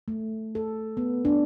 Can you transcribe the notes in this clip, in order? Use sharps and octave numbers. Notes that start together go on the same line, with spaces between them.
A3
A4
B3
D4